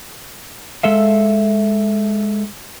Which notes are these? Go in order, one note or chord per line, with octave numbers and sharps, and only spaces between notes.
G#3 A4 E5 F5